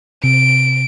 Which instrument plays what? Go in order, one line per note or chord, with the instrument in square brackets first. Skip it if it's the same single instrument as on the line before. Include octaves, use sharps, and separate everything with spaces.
[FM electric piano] C3 [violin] D7